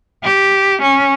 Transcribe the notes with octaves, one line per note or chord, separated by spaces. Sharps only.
G4
C#4